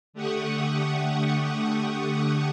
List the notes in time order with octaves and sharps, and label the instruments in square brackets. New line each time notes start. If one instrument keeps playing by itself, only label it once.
[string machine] D3 A3 G4 F#5 C#6 D#6